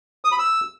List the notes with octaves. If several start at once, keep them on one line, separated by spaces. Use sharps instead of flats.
D#6
B5
E6